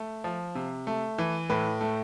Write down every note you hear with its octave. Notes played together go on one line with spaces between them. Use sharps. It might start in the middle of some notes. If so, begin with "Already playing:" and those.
Already playing: A3
F3
C3
A3
E3
A2 B4
A3